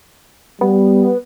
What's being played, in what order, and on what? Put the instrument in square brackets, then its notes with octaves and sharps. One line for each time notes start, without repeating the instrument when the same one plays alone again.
[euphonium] G3 [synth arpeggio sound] B3